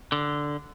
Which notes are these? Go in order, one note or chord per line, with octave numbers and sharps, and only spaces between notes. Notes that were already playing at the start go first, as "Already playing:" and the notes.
D3